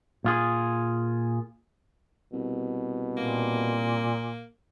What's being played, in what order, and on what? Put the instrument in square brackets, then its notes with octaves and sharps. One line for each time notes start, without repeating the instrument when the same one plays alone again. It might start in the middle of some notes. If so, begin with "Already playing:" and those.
[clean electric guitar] A#2 F4 G#4
[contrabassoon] C2 [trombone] B2
[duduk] A#2 [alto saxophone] A#3